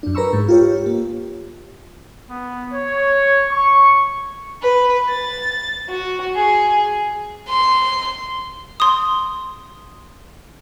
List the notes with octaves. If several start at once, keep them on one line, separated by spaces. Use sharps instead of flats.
F#2 D4
A#4 B4 A#5 B5 C#6 E6
G#2
F4 G4 C#5
A#3
B3
C#5
C#6
B4
A6
F#4
G#4
C6
C6 D#6